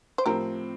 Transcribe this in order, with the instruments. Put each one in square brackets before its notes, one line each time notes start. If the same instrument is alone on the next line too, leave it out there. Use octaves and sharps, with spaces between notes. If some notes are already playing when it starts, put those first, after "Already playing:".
[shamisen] C5
[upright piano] A2 F3 C4 [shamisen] G4 A#4